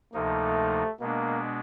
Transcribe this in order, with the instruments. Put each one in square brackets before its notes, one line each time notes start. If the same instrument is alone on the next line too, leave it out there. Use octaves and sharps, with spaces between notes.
[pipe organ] D2 C3 F3 A#3 D#4 [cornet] A3
[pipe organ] B2 G#3 B3 D4 [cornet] A#3